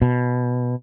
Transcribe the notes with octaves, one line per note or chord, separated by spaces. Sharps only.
B2